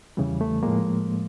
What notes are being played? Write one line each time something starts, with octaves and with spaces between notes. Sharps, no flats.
E2 C#3 E3 G3
A3
A2 F3 G#3 A#3